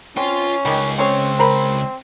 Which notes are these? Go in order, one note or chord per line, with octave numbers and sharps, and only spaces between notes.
C4 C#4 F4 C6
C#2 D#3 G3
C4 C#4 G#4 C#5
A#4 C5 B5